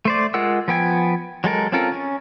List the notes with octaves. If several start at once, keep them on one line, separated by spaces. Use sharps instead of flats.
A3 C5 D5
G#3 F4 A#4 F#5 E6
F3 B3 G5 G#5
F#3 G#3 A4 A#4
C4 C#4 F4 A4 A#4
C#4